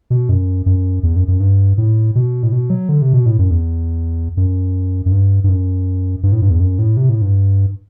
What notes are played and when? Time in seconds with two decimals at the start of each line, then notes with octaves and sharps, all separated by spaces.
0.10 B2
0.29 F#2
0.66 F#2
1.03 E2
1.16 F#2
1.28 F#2
1.40 G2
1.78 A2
2.15 B2
2.43 A2
2.52 B2
2.70 F#3
2.89 D3
3.02 C3
3.13 B2
3.26 A2
3.39 F#2
3.51 E2
4.37 F#2
5.06 F#2
5.12 G2
5.44 G2
5.49 F#2
6.23 G2
6.32 A2
6.42 G2
6.51 E2
6.60 F#2
6.79 A2
6.97 C3
7.09 A2
7.22 G2